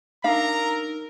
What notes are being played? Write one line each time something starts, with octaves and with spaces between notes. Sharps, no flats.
D4 D#4 A#4 F5 A#5 E6